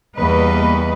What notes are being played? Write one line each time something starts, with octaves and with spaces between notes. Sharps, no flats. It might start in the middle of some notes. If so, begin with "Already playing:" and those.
E2 G3 A#3 B4 D#5